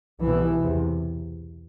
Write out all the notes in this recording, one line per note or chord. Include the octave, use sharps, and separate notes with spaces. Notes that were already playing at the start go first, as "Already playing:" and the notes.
C2 B2 E3
E2 C3